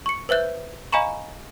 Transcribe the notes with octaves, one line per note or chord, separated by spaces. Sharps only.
C#6 C#7
B4 C5 E5 F#6 G6
D#5 F5 G#5 A#5 B5 C#6